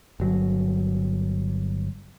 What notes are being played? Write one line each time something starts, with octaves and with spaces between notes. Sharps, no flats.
G1 F#3